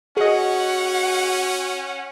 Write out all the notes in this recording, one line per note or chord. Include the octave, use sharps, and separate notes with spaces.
C#4 F#4 G#4 D#5 F#5